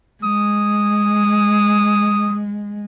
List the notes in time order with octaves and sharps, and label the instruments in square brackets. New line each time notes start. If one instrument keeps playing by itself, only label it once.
[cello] G#3 [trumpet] D#6